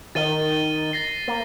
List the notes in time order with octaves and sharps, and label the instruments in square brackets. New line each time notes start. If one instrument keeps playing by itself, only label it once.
[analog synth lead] D#3 [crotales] A6 D#7 G7
[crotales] A6 A#6 C7
[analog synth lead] A#3